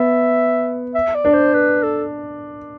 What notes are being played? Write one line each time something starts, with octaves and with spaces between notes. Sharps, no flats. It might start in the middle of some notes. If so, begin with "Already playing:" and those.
Already playing: B3 E5
E5
D5
D4
C5
B4
A4